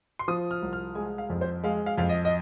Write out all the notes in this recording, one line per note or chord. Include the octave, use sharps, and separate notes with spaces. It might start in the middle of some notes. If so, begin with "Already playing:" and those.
C6
F3 D#6
F6
C2
F6
G#3 G#5
F5
F2
C5
G#3 F5
F5
F2 F5
D#5
D#5